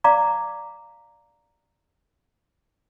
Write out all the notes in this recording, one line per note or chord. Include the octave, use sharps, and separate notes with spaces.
D5 F5 A#5 D6